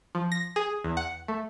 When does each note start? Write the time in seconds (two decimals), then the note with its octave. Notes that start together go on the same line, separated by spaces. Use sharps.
0.15 F3
0.32 A#6
0.56 G#4
0.84 E2
0.97 F#5
1.28 A3